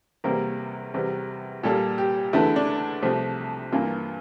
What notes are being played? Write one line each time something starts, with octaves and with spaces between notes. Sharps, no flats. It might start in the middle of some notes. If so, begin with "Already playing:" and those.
E2 C3 G3 A#3 A#4
E2 C3 G3
A#2 G3 A#3 A4
G4
E2 D3 A3 E4
D4
C2 C3 F3 A3
G2 E3 A#3 F4